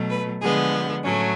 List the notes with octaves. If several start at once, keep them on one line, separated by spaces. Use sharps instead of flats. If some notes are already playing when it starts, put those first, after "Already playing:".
Already playing: B2 F#3 A3
B4
D3 F3 G#3 B3 G#4
A2 F#3 A3 C#4